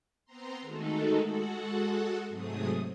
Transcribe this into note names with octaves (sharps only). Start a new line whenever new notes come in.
B3 C4 A#5 C6
D#3 G#3 A3 D#4 F#4 A4
G#3 F#4 A4 F#5
G#2 C3 F#3 A3 G#4 D#6